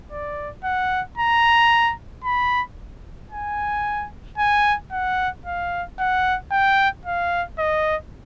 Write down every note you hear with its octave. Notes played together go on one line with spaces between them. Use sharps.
D5
F#5
A#5
B5
G#5
G#5
F#5
F5
F#5
G5
F5
D#5